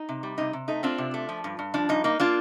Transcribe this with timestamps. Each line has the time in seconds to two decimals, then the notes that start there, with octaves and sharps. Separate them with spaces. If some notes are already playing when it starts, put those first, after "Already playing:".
Already playing: D#4
0.09 C3
0.23 G3
0.38 C3 D#4
0.53 C3
0.68 A3 D#4
0.83 C4 D4 F4
0.98 C3
1.14 A3
1.29 F3
1.44 G2
1.59 G2
1.74 F3 D4
1.89 G2 D#4
2.04 A#3 D#4
2.20 A#3 D4 F4